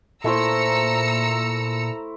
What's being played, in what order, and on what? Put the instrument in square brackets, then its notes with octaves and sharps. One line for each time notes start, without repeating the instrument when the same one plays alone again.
[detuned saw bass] A#2 [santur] A3 E4 C5 [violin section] A#5 E6 C#7